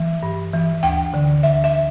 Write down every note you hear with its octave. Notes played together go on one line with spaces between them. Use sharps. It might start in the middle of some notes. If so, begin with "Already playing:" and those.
Already playing: E3
G2
E3
D2 G5
D3
D2 E5
E5